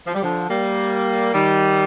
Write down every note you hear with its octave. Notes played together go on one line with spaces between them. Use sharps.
F3
G3
D3 F3
G3 A#3
D#3 G3